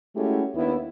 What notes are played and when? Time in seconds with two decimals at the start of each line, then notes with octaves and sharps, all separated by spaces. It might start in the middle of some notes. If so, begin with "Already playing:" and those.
0.16 G#3 A3 C#4 E4 F#4 G4
0.55 D#2 B3 D4 E4